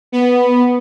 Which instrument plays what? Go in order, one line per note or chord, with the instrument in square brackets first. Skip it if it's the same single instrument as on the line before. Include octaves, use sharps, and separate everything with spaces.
[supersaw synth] B3